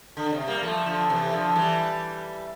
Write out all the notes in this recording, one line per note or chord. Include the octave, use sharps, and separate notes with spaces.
D3
C3
G3 A#3
F3 A3
D3 F3
C3 E3
D3 F3
E3 G3